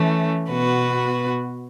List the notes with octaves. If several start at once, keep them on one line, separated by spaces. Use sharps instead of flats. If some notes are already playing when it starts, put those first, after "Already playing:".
Already playing: E3 A3 C#4
B2 B3 F#4 B4